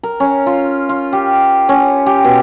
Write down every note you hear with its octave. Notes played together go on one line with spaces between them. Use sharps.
A#4
C#4
F4
F4
G4
C#4
G4
B2